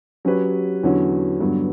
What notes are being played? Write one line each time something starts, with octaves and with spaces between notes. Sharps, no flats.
F#3 C#4 G4 B4
E2 D3 F#3 C#4 F#4
G2 D3 F#3 B3